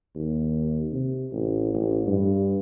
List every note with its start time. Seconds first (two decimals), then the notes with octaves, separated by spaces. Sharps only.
0.15 D#2
0.93 C3
1.32 A1
1.74 A1
2.07 G2